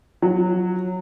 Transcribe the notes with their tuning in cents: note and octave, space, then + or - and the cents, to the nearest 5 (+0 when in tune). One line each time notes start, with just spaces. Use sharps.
F#3 -15